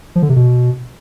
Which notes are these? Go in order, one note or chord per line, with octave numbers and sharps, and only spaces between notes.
F3
D3
C3
B2